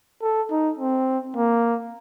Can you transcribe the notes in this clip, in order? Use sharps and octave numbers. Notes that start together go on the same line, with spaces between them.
A4
D#4
C4
A#3